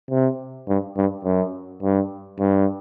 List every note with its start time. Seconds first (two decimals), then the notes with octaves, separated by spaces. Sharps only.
0.11 C3
0.68 G2
0.97 G2
1.25 F#2
1.83 G2
2.40 G2